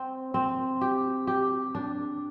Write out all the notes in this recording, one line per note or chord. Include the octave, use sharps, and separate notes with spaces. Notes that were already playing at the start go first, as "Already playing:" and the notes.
Already playing: C4
C4
G4
G4
D4